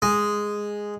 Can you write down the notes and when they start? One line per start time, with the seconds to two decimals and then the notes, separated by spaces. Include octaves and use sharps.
0.02 G#3